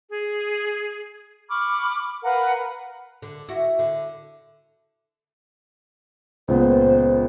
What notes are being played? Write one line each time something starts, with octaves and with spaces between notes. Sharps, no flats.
G#4
B5 C#6 D6 F6
A#4 B4 F5 F#5
D3
E4 F#4
D3
C#2 A#2 B3 C5